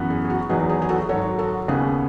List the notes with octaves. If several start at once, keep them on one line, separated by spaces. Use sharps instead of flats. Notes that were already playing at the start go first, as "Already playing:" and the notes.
Already playing: F#2 E3 B3
G#4
G#4
F#4
E2 D#3 F#3 B3 D#4 G#4
G#4
G#4
F#4 A4
G#2 D#3 F#3 A4 C#5
F#4 A4
D#2 C#3 G#3 B3 G#4